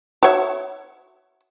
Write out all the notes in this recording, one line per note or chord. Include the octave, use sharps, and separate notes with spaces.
F#4 C#5 E5